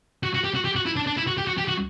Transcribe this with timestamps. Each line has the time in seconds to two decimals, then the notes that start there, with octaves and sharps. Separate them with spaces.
0.23 F#4
0.35 F#4
0.44 G4
0.55 F#4
0.65 G4
0.76 F#4
0.86 E4
0.96 D4
1.07 D4
1.17 E4
1.27 F#4
1.38 G4
1.47 F#4
1.58 G4
1.68 F#4